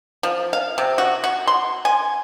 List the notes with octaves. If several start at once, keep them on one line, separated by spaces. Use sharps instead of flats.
F3
F5
C3
F#4
F#4
C6
G#5